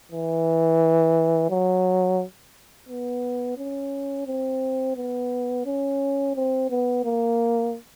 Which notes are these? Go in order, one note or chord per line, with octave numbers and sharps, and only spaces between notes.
E3
F#3
B3
C#4
C4
B3
C#4
C4
B3
A#3